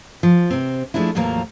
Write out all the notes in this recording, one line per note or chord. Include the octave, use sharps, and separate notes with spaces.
F3
C3 C4
F3 G#3 A3 D4 E4
E2 A2 F3 F#3 A#3 A#4